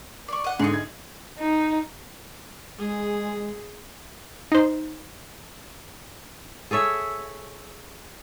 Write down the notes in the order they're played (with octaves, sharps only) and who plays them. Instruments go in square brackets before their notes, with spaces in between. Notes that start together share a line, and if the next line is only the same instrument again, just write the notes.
[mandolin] D5 C#6
D#5 F#5
[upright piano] G#2 D3 C#7 [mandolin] G#4 D#5
[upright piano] G#6
[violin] D#4
[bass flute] G#3 [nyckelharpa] G#4
[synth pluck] D#4 C5
[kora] G#4 A4 C#5 E5